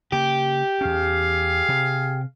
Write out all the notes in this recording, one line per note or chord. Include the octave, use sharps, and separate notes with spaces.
C#3 A#3 G4
E2 C#4 G#4 F5
C3